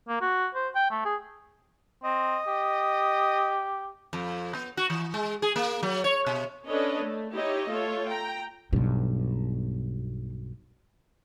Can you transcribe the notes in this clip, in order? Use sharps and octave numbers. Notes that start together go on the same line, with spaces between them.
A#3
F#4
C5
G5
A3
G#4
C4 D#5
G4
F2
B3
F#4
E3
G#3
G#4
A#3
F#3
C#5
B2
C#4 D4 A4 B4 C#5 D#5
A3
D#4 E4 G4 C#5 D#5
A3 F4 A4 C#5
G5 A#5
B1 G2 B2